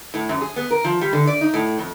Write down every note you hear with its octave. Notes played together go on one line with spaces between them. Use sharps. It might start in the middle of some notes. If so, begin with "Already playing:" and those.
A2
F#2
G#4
B3
A#4
F3
G3
D3
D5
D#4
A2
F2